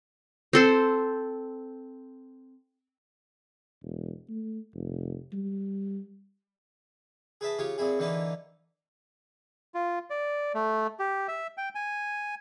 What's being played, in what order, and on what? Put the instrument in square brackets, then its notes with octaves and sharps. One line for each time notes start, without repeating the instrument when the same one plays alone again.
[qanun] C4 A4 C5
[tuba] E1
A3
F1
G3
[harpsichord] G#4 B4 E5 A5
C#3 F4 G4 C#5
A#2 C4 E4 G#4
D3 E3 A#3 D#4 A#4 B4
[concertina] F4
D5
A3
G4
E5
G5
G#5